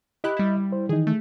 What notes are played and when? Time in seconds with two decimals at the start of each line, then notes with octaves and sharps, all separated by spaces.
0.24 E4 G4 D#5 B5 F#6
0.37 G3 E4
0.72 C5
0.89 D#3 E3 D#4 G#4
1.07 A3